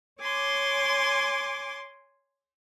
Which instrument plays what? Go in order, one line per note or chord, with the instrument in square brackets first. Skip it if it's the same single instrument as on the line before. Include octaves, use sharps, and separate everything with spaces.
[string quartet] C#5 G#5 C6 D6